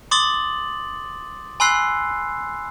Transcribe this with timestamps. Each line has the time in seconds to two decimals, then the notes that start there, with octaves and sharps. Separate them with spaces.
0.11 C6 D6 D#6 A6 F#7
1.60 G#5 B5 C6 E6 F#6 C7